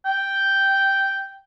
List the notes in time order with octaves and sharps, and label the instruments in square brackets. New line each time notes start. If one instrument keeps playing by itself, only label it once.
[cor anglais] G5